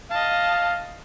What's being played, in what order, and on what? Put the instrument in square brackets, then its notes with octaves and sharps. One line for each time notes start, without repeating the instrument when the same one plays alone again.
[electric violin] D#5 A5 [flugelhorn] F5